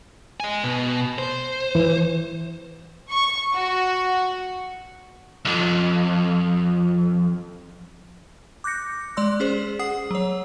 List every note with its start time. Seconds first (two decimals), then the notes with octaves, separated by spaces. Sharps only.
0.40 D#5 G#5
0.63 B2
1.18 C5
1.75 E3
3.11 C#6
3.54 F#4
5.45 C2 F2
8.64 D6 F#6 G6 A#6 C#7
9.17 G#3 D5 C6 E6
9.40 C#4 G#4 C5
9.79 G#4 F#5 D#6 C7
10.11 F#3 C#5